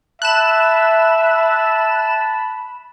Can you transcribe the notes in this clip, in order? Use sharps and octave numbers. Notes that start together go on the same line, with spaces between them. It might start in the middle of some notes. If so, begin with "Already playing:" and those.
E5 A5 B5 F#6 E7